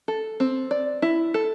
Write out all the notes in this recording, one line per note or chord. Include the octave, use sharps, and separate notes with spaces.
A4
C4
D5
E4
A4